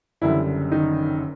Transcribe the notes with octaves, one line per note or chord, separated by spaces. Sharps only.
F#1 F#2 D3 E3 G3 E4
D#3 D#4